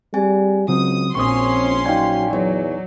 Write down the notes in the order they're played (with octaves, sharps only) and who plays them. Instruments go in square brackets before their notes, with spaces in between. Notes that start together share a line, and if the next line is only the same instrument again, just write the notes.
[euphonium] G3 [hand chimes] C4 G#4 G#5
[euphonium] C#2 [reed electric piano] C#3 F#3 C4 [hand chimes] F#4 [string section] D#6
[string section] A#1 C#4 C6 [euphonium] C4 [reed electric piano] C#6 D#6
[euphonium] F#3 [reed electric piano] D#4 G#5 [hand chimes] D5 F5 G5
[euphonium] E2 [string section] F#3 [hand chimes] C#5 D5